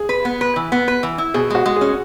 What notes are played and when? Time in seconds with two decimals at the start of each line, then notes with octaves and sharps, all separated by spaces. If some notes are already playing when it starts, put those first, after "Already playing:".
Already playing: G#4
0.09 B4
0.25 B3
0.41 B4
0.56 E3
0.72 B3
0.88 B4
1.03 E3
1.18 E4
1.34 B2 G#4
1.50 G#3 F#4
1.66 G#3
1.76 G#4
1.81 C#4